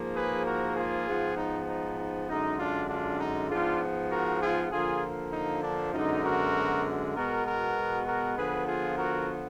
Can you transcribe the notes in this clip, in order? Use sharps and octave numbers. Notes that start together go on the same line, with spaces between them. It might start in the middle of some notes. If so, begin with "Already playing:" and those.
Already playing: G#2 F3 A#3
G#4 B4
F#4 A#4
F4 G#4
G#2 F3 B3
D#4
D#4
D#4
F#2 D3 G#3 D#4
D4 F4
D4 F4
D#4
G#2 F3 B3 D4 F4
F#4 A#4
F4 G#4
D3 F3 A#3 F4 G#4
D#4
D4
F#2 D3 G#3 B3 D#4
F#4 A#4
B2 G#3 B3 F#4 A#4
F#4 A#4
F#4 A#4
D3 F3 B3 G#4 B4
F4 G#4
F#4 A#4